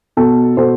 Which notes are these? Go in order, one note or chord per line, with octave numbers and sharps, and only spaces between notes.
B2 A4
B2 A4 C5